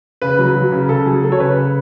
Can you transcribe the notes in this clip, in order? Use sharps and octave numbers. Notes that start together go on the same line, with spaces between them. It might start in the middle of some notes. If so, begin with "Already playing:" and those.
C#3 B4
F#3
F#3
C#3
C#3 A4
F#3 G#4
F#3 A4
C#5
C#3 B4
C#3